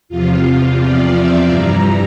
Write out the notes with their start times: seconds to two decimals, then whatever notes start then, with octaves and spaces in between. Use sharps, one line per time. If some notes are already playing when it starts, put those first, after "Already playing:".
0.09 E2 C3 F3 F4
0.80 D5
1.15 E5
1.49 G2 E3 G3 A#5